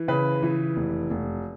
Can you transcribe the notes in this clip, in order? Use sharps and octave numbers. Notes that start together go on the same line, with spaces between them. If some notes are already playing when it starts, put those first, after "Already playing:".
Already playing: E3
C#3 B4
E3
F1
F1